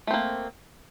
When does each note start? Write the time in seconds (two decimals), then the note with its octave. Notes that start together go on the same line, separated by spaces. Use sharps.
0.07 A3
0.10 C4
0.14 A#3